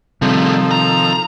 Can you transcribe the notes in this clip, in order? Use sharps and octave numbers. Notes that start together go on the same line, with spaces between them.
C3 D#3 F3 G3 A3 A4
A#5